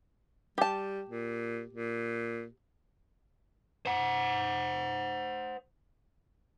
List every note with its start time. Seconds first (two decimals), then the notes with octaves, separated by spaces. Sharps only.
0.58 G3 G4 A5
1.09 A#2
1.73 A#2
3.86 C5 F#5